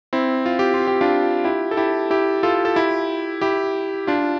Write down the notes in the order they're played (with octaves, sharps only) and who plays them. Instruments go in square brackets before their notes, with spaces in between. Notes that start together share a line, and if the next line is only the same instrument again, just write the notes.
[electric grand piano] C4 E4
F4
G4
F4
G4
D4 F4
E4 G4
A4
E4 G4
E4 G4
F4 A4
A4
E4 G4
E4 G4
D4 F4